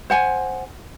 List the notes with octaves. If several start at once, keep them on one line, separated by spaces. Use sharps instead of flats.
C5 F#5 G#5